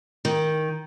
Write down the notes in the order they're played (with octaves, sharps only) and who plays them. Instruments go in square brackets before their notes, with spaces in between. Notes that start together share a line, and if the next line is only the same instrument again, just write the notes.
[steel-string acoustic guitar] D#3